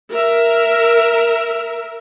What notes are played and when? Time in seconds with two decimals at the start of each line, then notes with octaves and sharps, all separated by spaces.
0.13 A#4 E5